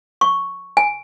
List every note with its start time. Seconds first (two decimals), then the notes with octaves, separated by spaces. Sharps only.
0.21 C#6
0.77 G#5